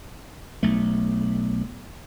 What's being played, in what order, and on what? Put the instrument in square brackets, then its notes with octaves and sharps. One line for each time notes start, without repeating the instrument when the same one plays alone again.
[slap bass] B1 A3